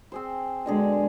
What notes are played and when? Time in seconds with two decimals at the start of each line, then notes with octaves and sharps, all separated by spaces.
0.12 C4 G#4 C5
0.66 B2 D3 G#3 G#4